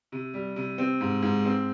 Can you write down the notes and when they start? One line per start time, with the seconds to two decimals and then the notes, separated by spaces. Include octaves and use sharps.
0.12 C3
0.34 G3
0.56 C3
0.78 C4
1.01 G#2
1.22 G#2
1.45 C4